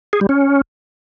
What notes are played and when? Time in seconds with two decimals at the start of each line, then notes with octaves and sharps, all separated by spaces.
0.13 G#4
0.21 G3
0.29 C#4